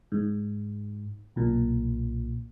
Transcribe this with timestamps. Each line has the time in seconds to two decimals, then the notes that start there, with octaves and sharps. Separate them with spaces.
0.12 G#2
1.36 B1 A#2